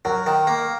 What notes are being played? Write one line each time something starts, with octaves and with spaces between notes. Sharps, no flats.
F#3 A#4
D#3
A#3